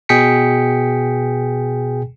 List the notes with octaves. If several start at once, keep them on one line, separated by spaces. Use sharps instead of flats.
B2 G#4 G5 G#5 B6 C#7